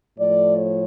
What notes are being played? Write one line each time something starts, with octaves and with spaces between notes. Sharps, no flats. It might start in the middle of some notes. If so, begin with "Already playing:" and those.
A2 F3 A3 D5
C#5